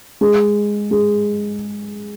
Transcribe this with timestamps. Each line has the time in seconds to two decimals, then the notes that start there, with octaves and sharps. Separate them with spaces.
0.21 G#3
0.91 G#3